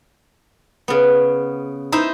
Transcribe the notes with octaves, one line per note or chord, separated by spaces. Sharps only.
C#3 B3
D#4 E4 C5 E5